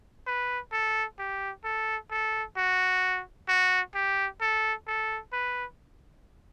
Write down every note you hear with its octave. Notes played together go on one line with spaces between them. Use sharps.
B4
A4
G4
A4
A4
F#4
F#4
G4
A4
A4
B4